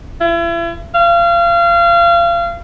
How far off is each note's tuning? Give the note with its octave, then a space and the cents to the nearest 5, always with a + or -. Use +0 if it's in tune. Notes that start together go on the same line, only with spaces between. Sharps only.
E4 +40
F5 -30